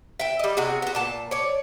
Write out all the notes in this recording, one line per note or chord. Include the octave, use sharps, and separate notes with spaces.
E5 G5
G3 D#5
C3 F#4 G#4
B3 F#4
A#2 A5
C#5 D5